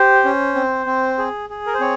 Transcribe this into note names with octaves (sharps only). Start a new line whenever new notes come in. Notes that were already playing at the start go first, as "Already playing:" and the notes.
Already playing: G4 C5
C#4
C4
C4
G#4
G#4
A#4
C5
C4 C#5